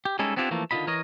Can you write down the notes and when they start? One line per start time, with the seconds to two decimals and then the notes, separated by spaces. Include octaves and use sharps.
0.05 G4
0.19 G3 G#3 C#4 D#4 E4 A4
0.36 B3 C4 D4 E4 F4 G4
0.51 E3 F3 A3 A#3
0.71 D3 D#3 F#3 F4 D#5 B5
0.87 E3 A#4 C#5 D#5